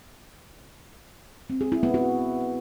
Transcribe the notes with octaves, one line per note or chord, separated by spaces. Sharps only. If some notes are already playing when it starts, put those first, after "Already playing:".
C4
G#4
E4
B3
F#4